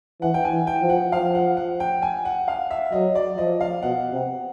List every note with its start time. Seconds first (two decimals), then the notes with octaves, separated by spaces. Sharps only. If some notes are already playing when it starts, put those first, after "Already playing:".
0.22 E3 F#5
0.34 G5
0.45 G#5
0.52 E3
0.67 G5
0.82 F3
0.89 F#5
1.12 F3 F5
1.35 F#5
1.57 F#5
1.80 G5
2.02 G#5
2.25 F#5
2.48 F5
2.71 E5
2.92 F#3 D#5
3.15 D5
3.38 F3 D#5
3.61 F5
3.82 B2 F#5
4.13 C3